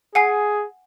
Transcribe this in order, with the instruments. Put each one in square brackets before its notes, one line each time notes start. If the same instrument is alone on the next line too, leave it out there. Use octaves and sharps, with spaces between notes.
[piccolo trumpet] G#4 [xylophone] F#5 G#5 C7